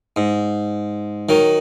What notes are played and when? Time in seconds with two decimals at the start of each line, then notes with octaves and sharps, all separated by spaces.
0.16 G#2
1.29 D#3 F#3